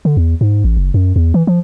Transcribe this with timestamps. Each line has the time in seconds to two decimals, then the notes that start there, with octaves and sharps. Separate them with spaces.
0.05 D3
0.17 E2
0.41 G#2
0.64 A1
0.77 F#1
0.94 F#2
1.16 E2
1.34 E3
1.47 F3